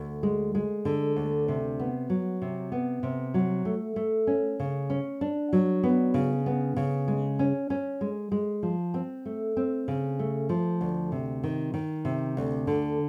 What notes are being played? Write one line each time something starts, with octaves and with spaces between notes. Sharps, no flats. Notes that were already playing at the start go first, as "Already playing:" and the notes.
Already playing: D2
G#3
G#3
D3
D2
C3
B3
F#3
C3
B3
C3
F#3
A3
A3
C#4
C#3
C#4
D4
F#3
B3
C#3
B3
C#3
G#3
C#4
C#4
G#3
G#3
F3
C4
A3
C4
C#3
A3
F3
D2
C3
D#3
D#3
C3
D2
D3